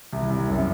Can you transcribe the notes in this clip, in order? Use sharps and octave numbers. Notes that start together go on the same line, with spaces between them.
C2
C2
F#2